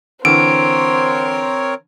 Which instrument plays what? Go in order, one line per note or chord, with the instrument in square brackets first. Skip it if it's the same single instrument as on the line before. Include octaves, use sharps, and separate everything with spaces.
[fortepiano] D3 E3 [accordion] C4 A#4 C#5 [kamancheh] C5 [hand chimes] D7